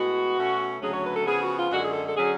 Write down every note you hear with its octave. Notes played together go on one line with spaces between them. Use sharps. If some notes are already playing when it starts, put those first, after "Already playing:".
Already playing: A2 G#3 B3 F#4
B2 A3 C#4
D2 C#3 F#3 A3 C#4 G#4
C#5
B4
A4
C#3 F3 B3 G#4
F#4
F4
F#2 D3 G#3 F#4
G#4
A4
A4
D3 F#3 C#4 G#4